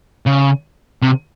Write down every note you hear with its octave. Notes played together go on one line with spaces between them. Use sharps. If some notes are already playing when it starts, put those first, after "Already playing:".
C#3
C3